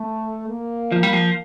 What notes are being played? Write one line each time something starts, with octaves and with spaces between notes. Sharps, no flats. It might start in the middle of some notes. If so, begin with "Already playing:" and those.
Already playing: A3
A#3
F3
G3
F3